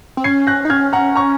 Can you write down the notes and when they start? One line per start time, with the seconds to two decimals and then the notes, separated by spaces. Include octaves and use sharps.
0.17 C4
0.24 C#4 G#6 C7
0.47 F#6 A#6
0.65 D#4
0.70 C#4 F6 G#6
0.93 F#5 A#5
1.16 A#5 C#6